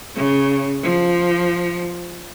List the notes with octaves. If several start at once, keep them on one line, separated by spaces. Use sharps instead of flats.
C#3
F3